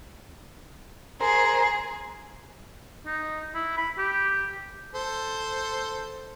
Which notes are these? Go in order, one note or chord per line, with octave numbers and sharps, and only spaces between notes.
G#4 A#4 C5
D#4
E4
B5
G4
A4 C5